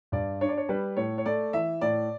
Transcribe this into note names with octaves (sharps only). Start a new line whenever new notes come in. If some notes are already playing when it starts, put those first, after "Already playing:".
G2 D5
D4 C#5
D5
C#5
G3 B4
A2 C#5
C#5
A3 D5
E3 E5
A2 D5